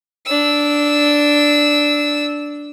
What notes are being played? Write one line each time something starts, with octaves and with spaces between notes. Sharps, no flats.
D4 E6